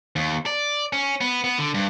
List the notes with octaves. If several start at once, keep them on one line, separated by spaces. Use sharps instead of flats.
D#2
D5
C#4
B3
B3
D3
G2